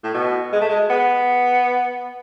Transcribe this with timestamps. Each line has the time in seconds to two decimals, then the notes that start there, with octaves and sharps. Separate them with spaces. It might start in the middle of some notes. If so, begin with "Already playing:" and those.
0.04 A2
0.14 B2
0.52 G#3
0.61 A3
0.69 G#3
0.90 B3